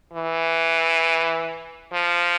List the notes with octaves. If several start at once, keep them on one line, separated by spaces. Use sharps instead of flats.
E3
F3